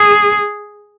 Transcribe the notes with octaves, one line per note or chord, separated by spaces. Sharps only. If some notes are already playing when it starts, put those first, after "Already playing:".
Already playing: G#4